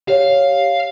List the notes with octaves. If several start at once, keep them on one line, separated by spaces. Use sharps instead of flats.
G4 C#5 F5